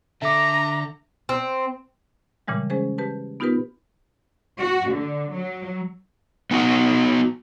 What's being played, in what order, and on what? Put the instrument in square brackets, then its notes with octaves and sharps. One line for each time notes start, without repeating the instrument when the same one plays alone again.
[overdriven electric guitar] D3 A4 [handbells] E5 D6 [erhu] A#5
[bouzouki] C4
[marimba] A#2 C#3 E3 G3 G#3
G#3 C#4 G#4 C5
G4 B4 A5
B3 D#4 F4 G4 A#4 B4
[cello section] F#4
D3
F#3
[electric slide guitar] B3 D#4 F#4